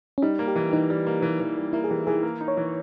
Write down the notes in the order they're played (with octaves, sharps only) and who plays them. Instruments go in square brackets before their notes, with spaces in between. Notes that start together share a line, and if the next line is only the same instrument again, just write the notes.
[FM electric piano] C#4
[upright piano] G3 [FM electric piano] D#4
[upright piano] A#3
[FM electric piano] G4
[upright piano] E3
[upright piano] E3 [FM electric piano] D#4
[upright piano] G3
A#3
E3
E3
G3
[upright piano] A#3 [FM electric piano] E4
[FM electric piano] G#4
[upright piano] E3 [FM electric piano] G4
[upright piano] E3 [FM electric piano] G#4
[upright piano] A#3
D#4
[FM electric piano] C#5
[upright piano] E3